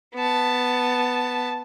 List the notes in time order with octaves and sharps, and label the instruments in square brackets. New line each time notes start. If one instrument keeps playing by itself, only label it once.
[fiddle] B3 A5